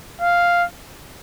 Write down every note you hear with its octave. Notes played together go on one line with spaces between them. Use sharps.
F5